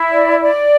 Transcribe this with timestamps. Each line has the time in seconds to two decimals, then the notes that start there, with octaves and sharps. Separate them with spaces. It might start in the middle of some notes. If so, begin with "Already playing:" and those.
Already playing: E4
0.10 D5
0.40 D5